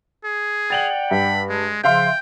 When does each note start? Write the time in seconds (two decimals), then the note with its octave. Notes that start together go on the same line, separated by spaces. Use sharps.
0.24 G#4
0.70 D5 F#5 G5 A6 F7 F#7
1.11 G2 B5
1.49 G#3
1.84 C#3 F3 E5 F5 G5 C6